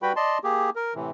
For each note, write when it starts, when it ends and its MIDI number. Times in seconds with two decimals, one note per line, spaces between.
0.02 0.12 55
0.02 0.12 66
0.02 0.12 71
0.02 0.12 79
0.02 0.12 83
0.16 0.38 74
0.16 0.38 75
0.16 0.38 81
0.16 0.38 84
0.44 0.70 58
0.44 0.70 67
0.44 0.70 68
0.76 0.94 70
0.95 1.11 45
0.95 1.11 48
0.95 1.11 52